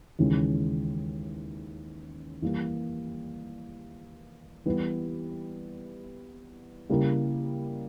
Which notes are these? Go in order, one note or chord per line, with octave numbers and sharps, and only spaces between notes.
D#2 C#3 E3 G#3 C#4
E3 G3 A#3
E3 G3 B3 E4 G4
C#3 G3 A#3 E4 A#4